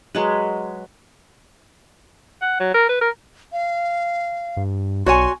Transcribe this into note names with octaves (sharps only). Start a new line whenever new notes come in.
F#3 G#3 B4
F#5
F#3
A#4
B4
A#4
F5
G2
B1 F#4 C#5 G#5 C6